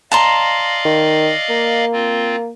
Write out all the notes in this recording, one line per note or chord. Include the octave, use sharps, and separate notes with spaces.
D5 D#5 F5 A5 A#5 C6
D#3
A#3
C4 F4